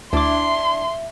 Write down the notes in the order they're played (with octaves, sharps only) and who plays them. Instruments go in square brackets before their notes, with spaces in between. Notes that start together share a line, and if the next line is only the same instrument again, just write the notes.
[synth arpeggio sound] D2 D6 [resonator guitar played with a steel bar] D4 E4 [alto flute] E5 [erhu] C6